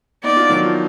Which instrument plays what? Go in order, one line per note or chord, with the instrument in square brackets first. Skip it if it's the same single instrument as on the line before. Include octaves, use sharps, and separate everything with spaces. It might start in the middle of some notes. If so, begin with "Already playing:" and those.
[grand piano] B3 D#4 [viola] D5
[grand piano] D4 F4
D#3 F#3
F3